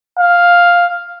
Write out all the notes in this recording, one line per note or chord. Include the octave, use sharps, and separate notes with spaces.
F5